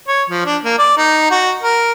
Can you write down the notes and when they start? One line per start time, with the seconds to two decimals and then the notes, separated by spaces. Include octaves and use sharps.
0.08 C#5
0.30 F3
0.46 D4
0.64 A#3
0.78 D5
0.97 D#4
1.31 F#4
1.62 A#4